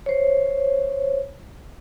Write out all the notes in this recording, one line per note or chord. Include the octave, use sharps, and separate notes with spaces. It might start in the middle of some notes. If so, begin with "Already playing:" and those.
C5 C#5